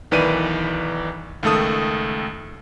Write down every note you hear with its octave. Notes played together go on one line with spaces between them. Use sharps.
B1 D#3 E3 B4 D5 D#7
C#2 D#3 A3 A4 D#6